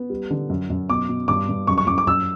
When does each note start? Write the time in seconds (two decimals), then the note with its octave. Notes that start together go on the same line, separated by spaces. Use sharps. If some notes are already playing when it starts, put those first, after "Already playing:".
Already playing: B3
0.10 G3
0.30 D3
0.50 F#2
0.70 F#2
0.90 B2 D6
1.09 B2
1.28 G2 D6
1.49 G2
1.67 F#2 C#6
1.78 C#6
1.87 F#2 D6
1.98 D6
2.07 F#2 E6